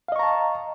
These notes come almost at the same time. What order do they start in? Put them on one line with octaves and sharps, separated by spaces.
F5 D#5 C#6 A#5 A5